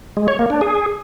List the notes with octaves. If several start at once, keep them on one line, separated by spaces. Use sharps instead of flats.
G#3
C#5
A#3
D4
G#4